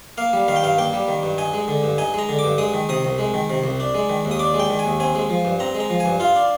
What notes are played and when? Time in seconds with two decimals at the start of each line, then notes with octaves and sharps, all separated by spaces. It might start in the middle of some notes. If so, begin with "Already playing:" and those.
0.18 A#3 F5
0.33 G3
0.48 D#3 F5
0.56 G5
0.63 G2 F5
0.78 A#3 G5
0.93 G3
1.08 D#3
1.23 G2
1.38 D#4 G#5
1.53 G#3
1.68 D3
1.83 G2
1.98 D#4 G#5
2.14 G#3 A#5
2.29 D3
2.39 D6
2.44 G2
2.58 G#3 D#6
2.74 D#3
2.89 C3 D#6
3.05 C2
3.18 G#3
3.34 D#3
3.50 C3
3.64 C2
3.80 D4
3.94 G#3
4.09 D#3
4.25 D#2
4.31 D#6
4.39 D4 D6
4.54 G#3
4.59 G5
4.70 D#3
4.79 G#5
4.85 D#2
5.00 C4 G#5
5.15 G#3
5.30 F3
5.45 G2
5.60 C4 A#5
5.75 G#3
5.80 A#5
5.90 F3
6.00 G#5
6.06 G2
6.20 F4 F5
6.36 D4